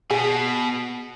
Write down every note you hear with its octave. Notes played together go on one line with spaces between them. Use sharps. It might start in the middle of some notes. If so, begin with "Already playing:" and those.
B2 G#4